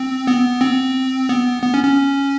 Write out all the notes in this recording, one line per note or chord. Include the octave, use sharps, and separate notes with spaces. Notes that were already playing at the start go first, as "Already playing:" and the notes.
Already playing: C4
B3
C4
B3
B3
C#4
C#4